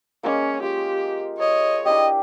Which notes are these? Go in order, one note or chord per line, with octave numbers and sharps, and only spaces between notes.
G#3 A#3 C#4
F4 G4
C#5 D#5
D4 E4 G4 D#5